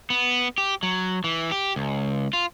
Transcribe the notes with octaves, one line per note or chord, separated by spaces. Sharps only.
B3
G4
F#3
E3
G4
C#2
F4